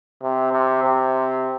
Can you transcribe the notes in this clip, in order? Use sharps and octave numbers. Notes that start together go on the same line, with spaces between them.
C3
C3
C3